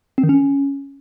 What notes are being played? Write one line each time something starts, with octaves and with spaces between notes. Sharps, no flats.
C4
D#3
C#4